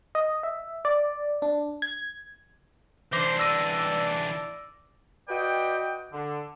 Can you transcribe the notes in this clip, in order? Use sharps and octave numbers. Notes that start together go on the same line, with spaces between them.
D#5
E5
D5
D4
G#6
E3 D4 C5 D6 A#6
D5 E6 A#6 D#7
F#4 B4 D5 D#5 G5
D3